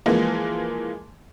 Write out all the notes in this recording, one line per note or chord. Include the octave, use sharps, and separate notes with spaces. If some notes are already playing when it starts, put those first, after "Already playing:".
E3 F3 G#3 A#3